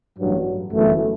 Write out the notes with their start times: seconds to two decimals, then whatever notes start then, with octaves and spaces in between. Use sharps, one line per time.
0.17 A1 G2 F#3
0.72 G1 F#2 E3 A3